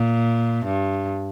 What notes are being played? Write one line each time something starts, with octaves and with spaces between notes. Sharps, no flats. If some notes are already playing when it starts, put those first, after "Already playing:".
Already playing: A#2
G2